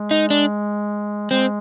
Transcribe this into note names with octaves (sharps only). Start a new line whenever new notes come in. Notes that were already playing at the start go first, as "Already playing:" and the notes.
Already playing: G#3
D#4
D4
G#3 C4